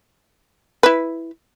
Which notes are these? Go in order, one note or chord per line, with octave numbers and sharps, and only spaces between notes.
E4 B4